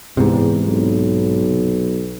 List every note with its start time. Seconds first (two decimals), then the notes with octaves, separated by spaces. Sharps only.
0.17 E2 G#2 C3
0.66 B1